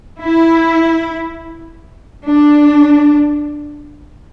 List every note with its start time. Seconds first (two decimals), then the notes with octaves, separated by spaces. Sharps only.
0.22 E4
2.24 D4